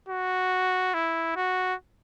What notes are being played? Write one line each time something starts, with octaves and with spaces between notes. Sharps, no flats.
F#4
E4
F#4